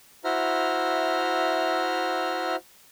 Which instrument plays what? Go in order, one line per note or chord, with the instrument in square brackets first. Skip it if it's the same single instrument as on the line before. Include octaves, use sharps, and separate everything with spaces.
[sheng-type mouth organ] E4 F#4 C5 E5 A#5 F6